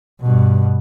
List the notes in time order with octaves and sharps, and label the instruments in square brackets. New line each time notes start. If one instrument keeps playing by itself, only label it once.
[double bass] G2 B2